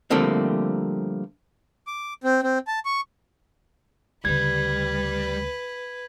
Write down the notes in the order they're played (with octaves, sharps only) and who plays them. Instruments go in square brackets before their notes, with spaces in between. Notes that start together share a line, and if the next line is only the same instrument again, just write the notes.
[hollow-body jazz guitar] D3 F3 G3 A3 A#3 C4
[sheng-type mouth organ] D6
C4
C4
A5
C#6
[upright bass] D2 C#3 [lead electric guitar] G3 [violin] B4 [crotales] G#6